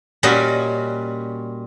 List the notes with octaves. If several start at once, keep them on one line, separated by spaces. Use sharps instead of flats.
A#2 G3 C#4 F#4 D#5